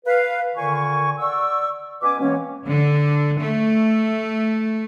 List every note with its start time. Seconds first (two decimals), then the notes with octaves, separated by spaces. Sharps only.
0.05 B4 F5
0.56 A#2 D3 D#3 G#5 C#6
1.19 D5 F#5 C#6 E6
2.01 B2 C#4 B4 G#5 D6
2.19 B2 E3 G#3 A#3 C4 C#4
2.67 D3
3.38 A3